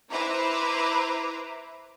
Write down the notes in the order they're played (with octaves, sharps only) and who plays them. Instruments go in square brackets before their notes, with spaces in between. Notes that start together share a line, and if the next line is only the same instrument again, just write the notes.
[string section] E4 B4 C5 E5 A#5 D6